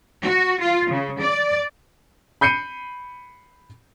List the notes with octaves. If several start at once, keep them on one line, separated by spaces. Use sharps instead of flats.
F#4
F4
C#3
D5
B5 G6 C7 C#7 D#7